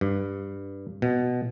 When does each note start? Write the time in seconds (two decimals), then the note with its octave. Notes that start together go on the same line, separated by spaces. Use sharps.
0.01 G2
1.02 B2